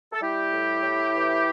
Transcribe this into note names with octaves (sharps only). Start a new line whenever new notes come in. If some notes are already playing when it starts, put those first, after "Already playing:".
A4
G3 E4 G4
A2
A2
E3